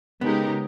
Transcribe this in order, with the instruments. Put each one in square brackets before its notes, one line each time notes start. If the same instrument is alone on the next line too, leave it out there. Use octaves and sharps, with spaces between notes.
[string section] C#3 G#3 D#4 G4 A#4 [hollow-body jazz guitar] B3